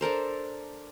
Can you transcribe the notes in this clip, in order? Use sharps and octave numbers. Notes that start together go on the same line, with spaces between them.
D4 A4 A#4 C5